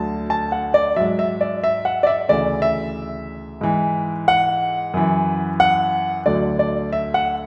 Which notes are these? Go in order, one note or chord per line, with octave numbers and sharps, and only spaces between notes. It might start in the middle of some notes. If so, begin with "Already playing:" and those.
Already playing: D2 D3 F#3 A5
A5
F#5
D5
G#2 F#3 E5
E5
D5
E5
F#5
D5
E5
D2 C#3 E3 D5
E5
G#2 E3
F#5
F#2 E3
F#5
D2 D3 F#3 D5
D5
E5
F#5